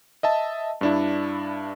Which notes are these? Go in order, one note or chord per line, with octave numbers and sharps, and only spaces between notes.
D#5 E5 A5
G2 D4 E4